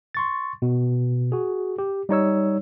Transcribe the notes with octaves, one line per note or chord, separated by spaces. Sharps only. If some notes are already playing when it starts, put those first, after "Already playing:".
C6 C#6 A6
B2
F#4 G#4
G4
G3 D#4 C#5 E6